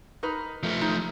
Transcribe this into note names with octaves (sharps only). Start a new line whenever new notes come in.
D#4 A#4 B4
F3 A3
D#4